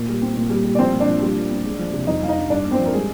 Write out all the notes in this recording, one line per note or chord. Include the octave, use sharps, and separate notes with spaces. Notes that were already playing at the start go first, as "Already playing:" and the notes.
Already playing: A#2
G3
C4
A#2
G3
G3
D5
F3 C4 C5
A#2
D4 D5
F3
G3
A#2
C4
G#3
F3
C3
F2 D#4 D#5
F2 F5
D#4 D#5
D4
G2 D4 D5
A#3
C4 C5
F3
A#4
G3 G#3 G#4